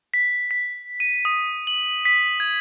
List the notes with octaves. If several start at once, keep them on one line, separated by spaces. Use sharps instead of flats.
B6
B6
D#7
D#6
F#7
B6
G#6